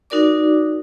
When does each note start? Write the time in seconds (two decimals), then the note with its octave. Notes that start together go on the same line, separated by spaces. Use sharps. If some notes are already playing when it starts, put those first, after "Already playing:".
0.10 D#4 F#4 A#4 D5 D6